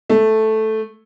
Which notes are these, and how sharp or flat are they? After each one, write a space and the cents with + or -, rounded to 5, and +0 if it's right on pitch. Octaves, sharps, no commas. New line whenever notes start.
A3 -5